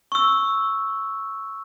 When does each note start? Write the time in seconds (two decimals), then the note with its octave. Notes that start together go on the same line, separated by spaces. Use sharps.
0.12 C#6 E6